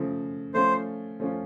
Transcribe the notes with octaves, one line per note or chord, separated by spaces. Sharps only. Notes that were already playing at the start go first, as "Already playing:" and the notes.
Already playing: C#3 F3 A3
F3 A3 C#4 F4 C5
F3 A3 C#4 F4